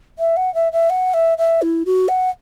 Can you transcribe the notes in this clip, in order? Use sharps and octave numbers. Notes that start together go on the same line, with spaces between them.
E5
F#5
E5
E5
F#5
E5
E5
E4
F#4
F#5